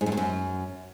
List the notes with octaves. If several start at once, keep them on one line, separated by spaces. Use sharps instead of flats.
G#2
F#2
G2
F#2